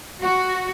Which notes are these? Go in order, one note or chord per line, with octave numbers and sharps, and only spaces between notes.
F#4